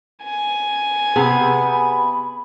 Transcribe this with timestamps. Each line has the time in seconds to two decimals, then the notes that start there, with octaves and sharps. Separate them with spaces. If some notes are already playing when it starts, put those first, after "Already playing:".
0.23 G#5
1.16 C3 B3 G#4 B5